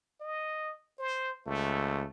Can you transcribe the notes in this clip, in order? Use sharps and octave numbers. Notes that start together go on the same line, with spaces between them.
D#5
C5
C#2 A3